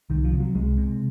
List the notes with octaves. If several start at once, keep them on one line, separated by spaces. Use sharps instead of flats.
C2 D#3
F3
C3
F#3
C2 G#3
C3